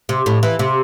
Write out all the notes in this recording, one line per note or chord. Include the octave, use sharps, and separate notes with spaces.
C3
A2
E3
C3